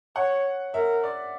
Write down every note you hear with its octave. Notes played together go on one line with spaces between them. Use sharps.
C#5 F#5
A#4 E5
D5